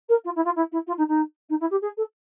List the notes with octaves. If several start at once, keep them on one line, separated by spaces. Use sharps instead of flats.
A#4
F4
E4
F4
E4
E4
F4
D#4
D#4
D#4
E4
G4
G#4
A4